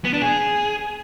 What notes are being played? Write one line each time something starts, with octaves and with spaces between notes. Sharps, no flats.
B3
D4
G#4